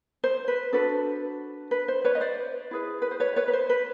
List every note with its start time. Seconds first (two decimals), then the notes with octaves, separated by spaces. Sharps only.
0.24 C5
0.48 B4
0.73 D4 F#4 A4 B4
1.71 B4
1.88 C5
2.04 B4 C#5
2.15 D#5
2.21 C5 D5
2.71 E4 G#4 B4
3.02 B4
3.11 C5
3.20 B4 C#5
3.36 B4 C#5
3.48 B4
3.53 C5
3.70 B4